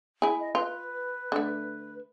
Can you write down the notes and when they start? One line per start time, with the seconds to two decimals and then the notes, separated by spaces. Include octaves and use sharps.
0.22 E4 G#4
0.40 D#5
0.55 F4 B4
1.32 D3 A3